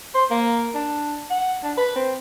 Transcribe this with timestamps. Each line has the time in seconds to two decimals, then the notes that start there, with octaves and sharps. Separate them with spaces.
0.15 C5
0.31 A#3
0.75 D4
1.30 F#5
1.63 D4
1.78 B4
1.96 C4